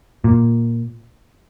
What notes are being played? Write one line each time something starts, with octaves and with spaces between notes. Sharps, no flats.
A#2